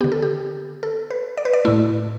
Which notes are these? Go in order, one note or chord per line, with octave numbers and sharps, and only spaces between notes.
D3 B3 G4
A4
G4
A4
B4
D5
B4
D5
A2 A3 E4